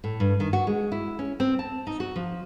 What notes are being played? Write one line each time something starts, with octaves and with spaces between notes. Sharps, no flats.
A2
G2
D#3
F#4
G#3
E4
C#4
C4
A5
D#4
F#4
F3